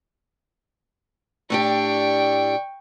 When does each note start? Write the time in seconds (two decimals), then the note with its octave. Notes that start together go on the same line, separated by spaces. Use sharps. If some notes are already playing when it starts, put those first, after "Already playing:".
1.50 A2 D4 G4 G5 C#6